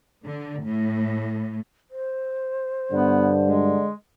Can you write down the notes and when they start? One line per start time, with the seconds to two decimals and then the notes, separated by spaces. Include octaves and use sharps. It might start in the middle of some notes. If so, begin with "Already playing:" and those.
0.25 D3
0.64 A2
1.91 C5
2.92 G2 D3 B3
3.46 G#3